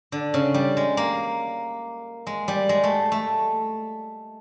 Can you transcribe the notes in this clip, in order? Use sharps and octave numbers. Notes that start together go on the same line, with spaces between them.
D3
C#3
G3
G#3
A#3
G#3
G3
G#3
A3
A3